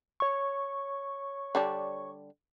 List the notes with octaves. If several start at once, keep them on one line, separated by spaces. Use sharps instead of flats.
C#5 C#6
D3 G3 D4